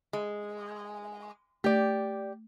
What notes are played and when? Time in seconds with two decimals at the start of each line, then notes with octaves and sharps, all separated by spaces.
0.13 G#3
1.64 A3 G4 D5